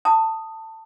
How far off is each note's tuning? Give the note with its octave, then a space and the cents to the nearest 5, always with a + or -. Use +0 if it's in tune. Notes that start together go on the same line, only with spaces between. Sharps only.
A5 +20 D#6 +0